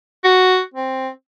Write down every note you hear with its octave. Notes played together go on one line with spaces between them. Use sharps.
F#4
C4